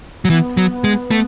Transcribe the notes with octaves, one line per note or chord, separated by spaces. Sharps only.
F#3
E3 B3
F#3
G#3
A3